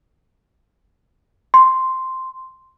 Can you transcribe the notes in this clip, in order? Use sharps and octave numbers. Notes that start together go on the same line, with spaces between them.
C6